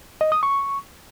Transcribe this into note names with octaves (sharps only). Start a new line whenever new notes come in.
D#5
D#6
C#6